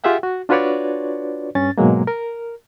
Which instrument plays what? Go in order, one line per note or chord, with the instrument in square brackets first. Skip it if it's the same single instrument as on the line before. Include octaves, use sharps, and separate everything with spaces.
[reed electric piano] F4 G4 G#4 E5 F#5 G5
F#4
D4 F4 F#4 B4 C#5 D5
G2 C#4 A6
G#2 B2 F#3 G#3 A#3
A#4